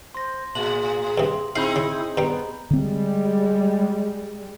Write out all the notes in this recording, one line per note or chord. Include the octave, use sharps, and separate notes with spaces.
C5 C6 A#6
A2 G#4 F#7
G2 C3
C4 D#4 E4 G#4 F5 B5 G6 F#7
C#3
G2 G3 B3 A#5
D3 G3 G#3 C4